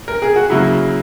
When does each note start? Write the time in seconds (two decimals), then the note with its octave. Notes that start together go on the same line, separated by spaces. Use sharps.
0.08 A#4
0.22 G#4
0.36 F#4
0.50 C#3 F#3 A#3 E4